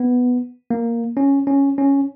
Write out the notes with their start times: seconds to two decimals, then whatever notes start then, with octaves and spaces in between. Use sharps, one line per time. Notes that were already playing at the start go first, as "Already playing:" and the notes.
Already playing: B3
0.71 A#3
1.17 C#4
1.47 C#4
1.78 C#4